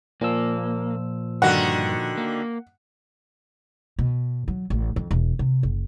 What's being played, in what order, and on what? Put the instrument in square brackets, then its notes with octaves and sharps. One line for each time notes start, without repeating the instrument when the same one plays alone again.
[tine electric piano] A#2 F3 E6 [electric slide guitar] A#3
[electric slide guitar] G2 [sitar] D3 D#3 F#4 [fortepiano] F#5
[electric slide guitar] A#3
[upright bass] B2
F#3
A1
F2
E1
C3
F#1